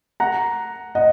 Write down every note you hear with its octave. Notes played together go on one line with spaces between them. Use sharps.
F#5 A#5
D#5 F#5